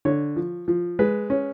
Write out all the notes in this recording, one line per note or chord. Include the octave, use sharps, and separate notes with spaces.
D3 C#5
F3
F3
G#3 B4
C#4